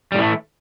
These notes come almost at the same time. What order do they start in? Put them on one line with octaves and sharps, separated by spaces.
G3 A2 E3 A3